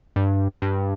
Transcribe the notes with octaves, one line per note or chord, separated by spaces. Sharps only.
G2
G2